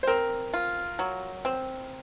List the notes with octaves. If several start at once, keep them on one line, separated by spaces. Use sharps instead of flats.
C5
C4 A#4
F4
F#3
C4